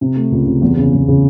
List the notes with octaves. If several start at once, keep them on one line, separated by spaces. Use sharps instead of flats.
C3
A3
C#2
C3
E2
C#3
E2
C#3